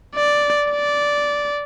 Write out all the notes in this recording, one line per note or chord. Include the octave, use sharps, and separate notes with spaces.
D5
D5